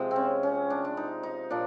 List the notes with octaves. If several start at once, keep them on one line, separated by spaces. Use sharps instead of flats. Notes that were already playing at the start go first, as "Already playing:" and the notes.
Already playing: C3 F3 G#3
C4
C#4
C#4
D4
D4
D#4
D#4
A#2 F3 D4